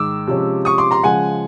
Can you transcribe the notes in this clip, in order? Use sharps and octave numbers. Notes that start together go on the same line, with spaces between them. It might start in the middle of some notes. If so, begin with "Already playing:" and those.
Already playing: G#2 D#3 G#3 D6 E6
C3 F3 G#3 C#4
C#6 D#6
C6 D6
A#5 C6
C#3 F3 G#3 F#5 G#5